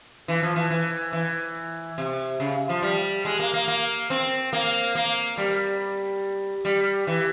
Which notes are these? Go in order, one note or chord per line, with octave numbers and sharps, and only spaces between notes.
E3
F3
E3
E3
E3
C3
C#3
F3
G3
G#3
A#3
A#3
A#3
C4
A#3
A#3
G3
G3
E3